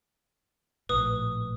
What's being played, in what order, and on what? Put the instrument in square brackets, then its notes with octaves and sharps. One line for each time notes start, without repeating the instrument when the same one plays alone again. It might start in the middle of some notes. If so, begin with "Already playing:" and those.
[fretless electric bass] A#1 A2 [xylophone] B4 D#6